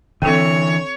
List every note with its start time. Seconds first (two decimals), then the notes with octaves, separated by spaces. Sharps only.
0.22 D3 E3 C4 A4 C#5